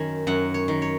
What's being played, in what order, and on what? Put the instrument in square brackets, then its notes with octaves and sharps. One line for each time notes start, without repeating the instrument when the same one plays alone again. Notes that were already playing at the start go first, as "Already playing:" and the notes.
Already playing: [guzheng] F#2 D#3 G#5
F#2 F#5
C#5
D#3
C#5